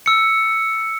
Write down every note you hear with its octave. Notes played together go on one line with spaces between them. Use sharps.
E6 C#7